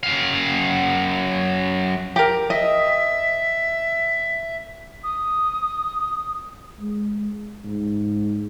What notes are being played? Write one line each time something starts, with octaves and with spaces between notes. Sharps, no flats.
F#2 F5
G4 A#4
D#5 E5
D#6
G#3
G#2